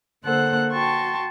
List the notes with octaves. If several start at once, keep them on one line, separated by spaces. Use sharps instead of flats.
D3 A#3 A4 C5 F#5 F#6
F#4 G5 A5 C6 C#6